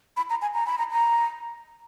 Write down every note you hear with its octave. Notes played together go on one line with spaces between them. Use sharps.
B5
A#5
G#5
A#5
B5
A#5
A#5